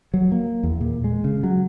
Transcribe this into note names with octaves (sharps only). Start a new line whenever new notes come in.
F#3
A#3
E2
A#2
G#3
C#3
F#3